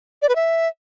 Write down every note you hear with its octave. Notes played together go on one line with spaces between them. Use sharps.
D5
B4
E5